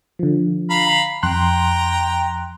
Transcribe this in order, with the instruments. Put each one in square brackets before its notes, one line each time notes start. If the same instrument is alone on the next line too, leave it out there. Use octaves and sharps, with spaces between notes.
[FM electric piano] D3 F3
[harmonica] F5 A#5 B5
[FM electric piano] F2 C6 F#6 [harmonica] G5 A#5